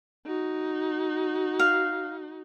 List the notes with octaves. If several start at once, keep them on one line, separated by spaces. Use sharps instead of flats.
D#4 F#4
F5